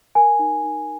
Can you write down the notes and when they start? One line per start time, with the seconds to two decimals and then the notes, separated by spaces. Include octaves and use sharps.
0.15 A#4 G#5
0.39 D#4
0.64 D#4